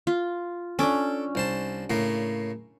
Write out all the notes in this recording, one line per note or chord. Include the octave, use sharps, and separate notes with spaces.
F4
C#4 D4 A4 D6
C2 C5 A5
A2 C#3 A#3